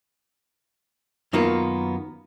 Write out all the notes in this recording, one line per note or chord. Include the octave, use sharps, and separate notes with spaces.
F#2 D#3 A#3 B3 F4